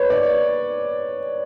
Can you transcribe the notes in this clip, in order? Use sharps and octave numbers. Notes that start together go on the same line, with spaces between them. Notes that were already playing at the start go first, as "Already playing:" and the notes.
Already playing: B4 C#5
D5